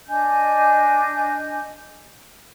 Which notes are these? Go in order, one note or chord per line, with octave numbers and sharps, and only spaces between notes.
D4 D#5 G#5 G6